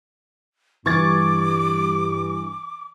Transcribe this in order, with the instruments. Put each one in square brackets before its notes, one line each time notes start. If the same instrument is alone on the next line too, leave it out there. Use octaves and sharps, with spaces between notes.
[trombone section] G2 [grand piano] E3 [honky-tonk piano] C#6 G#6 A6 [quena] D6